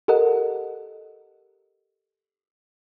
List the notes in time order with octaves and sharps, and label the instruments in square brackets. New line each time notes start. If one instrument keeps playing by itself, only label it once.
[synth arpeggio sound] G4 A4 A#4 D#5 F#5